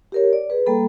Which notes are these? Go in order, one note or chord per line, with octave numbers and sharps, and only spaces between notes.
G4 A#4 C#5
D5
G#4 B4
G3 A#3 A4 B5